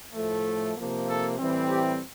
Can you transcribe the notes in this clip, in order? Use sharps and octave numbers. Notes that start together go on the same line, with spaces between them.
A2 F3 A3
C3 F3 A#3
A4
A2 E3 G3 C4
G4